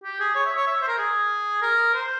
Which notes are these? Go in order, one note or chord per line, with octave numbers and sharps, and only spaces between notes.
G4
G#4
C#5
E5
C#5
E5
C5
A#4
G#4
A#4
C5